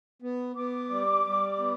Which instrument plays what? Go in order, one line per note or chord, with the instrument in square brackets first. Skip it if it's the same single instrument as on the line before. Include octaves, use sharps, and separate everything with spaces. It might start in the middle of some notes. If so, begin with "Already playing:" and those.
[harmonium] B3
[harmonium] B3 [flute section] D6
[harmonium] G3
G3
B3